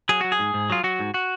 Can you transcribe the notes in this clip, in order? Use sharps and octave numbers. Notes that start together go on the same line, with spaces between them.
F#3 G#4
F#3 F#4
G#4
G#2
G#2
F#3 F4
F#3 F#4
G#2
F#4